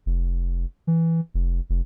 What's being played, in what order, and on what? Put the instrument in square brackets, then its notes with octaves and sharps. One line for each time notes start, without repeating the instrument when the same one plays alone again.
[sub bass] F1
E3
F1
F1